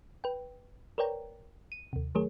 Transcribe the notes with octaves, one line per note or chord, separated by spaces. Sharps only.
B4 G5
A#4 B4 C#5 D5 G5 A#5
D#7
D#2 C3
D#3 F#3 A3 G#4 A#4 C#5